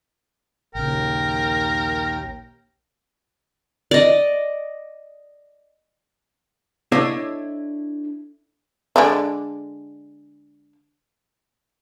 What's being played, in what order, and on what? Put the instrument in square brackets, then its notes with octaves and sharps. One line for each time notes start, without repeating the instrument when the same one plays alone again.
[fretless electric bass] A#1 C#3 [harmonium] D#2 G5 [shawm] A#4
[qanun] D5 D#5
[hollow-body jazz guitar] D4 E4 A4 C#5 D#5 E5
[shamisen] D3 G#3 D4